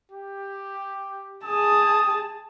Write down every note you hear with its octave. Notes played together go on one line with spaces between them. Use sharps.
G4
G#4 A5 D#6